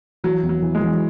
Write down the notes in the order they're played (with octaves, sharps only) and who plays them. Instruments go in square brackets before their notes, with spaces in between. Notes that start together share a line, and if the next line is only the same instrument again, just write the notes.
[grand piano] E3 [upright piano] F#3
[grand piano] E2
[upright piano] F#3
[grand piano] E3
[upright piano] G#3
[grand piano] E3